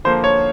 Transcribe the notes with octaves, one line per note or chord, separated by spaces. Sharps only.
D3 F3 A#3 C5
C#5